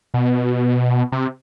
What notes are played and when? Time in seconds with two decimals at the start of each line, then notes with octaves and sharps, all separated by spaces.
0.14 B2
1.12 C3